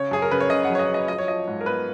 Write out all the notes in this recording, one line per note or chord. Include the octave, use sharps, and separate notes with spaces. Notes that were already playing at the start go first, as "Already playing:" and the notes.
Already playing: C#3 C#5
F#2 G#4
A#4
C#3 B4
C#5
C#3 D#5
F#5
F#3
C#5
D#5
F#3
D#5
F3 D#5
C#5
F3 D#5
G#2
A#4
B3 B4